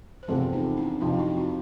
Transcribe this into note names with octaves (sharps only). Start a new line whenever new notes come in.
C5
E2 C3 F3 A3 C4 A4 B4
D#4 F4
D4 E4
F2 C3 F3 D#4 F4
E4 F#4
E4 F#4